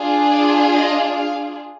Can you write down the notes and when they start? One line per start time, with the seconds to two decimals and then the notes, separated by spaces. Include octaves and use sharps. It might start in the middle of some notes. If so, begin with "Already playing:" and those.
Already playing: D4 F4 G#4
0.31 D5
0.74 D#5
1.16 F5